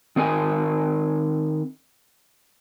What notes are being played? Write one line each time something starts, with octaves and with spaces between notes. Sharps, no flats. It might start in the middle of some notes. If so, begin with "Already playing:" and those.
D#3 C4 A#4 G#5